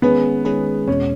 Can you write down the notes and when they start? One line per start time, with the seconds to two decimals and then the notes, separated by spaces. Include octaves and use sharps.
0.02 D#3 G#3 B3 C#4 G#4 B4
0.45 D#3 G#3 C#4 G#4 B4
0.87 E2 B2 G#3 C#4